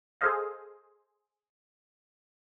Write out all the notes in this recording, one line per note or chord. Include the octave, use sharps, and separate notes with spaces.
G#4 A4 C5 D#5 F5